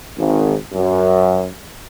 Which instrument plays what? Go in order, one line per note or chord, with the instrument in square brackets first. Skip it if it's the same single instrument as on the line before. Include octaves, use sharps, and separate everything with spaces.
[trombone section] G#1
F#2